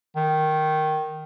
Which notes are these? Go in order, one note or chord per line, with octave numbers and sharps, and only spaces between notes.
D#3